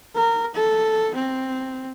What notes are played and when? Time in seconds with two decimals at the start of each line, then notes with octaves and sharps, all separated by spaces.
0.15 A#4
0.55 A4
1.15 C4